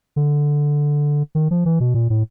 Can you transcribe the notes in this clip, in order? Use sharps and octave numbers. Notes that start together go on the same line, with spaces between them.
D3
D#3
F3
E3
B2
A#2
A2